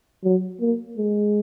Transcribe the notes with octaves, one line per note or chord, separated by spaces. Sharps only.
F#3
A#3
G#3